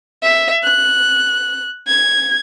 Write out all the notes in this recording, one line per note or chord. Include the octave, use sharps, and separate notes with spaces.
E5
F#6
G#6